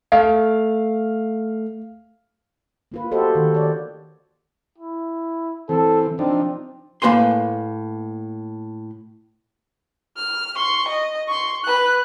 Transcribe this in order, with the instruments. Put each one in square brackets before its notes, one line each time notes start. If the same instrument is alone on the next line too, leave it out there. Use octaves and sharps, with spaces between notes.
[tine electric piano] A3 [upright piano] F5
[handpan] A#3 F4 B4
F#4 G4 A4 C5 D#5
D#3
C#5 D5
[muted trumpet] E4
[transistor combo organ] E3 C4 [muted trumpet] A4
[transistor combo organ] F3 D4 D#4 [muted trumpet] C4
[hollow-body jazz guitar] A2 A#3 E4 B4 G#5 C6
[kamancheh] F6
C6 C#6
D#5
C6 C#6
B4 F#6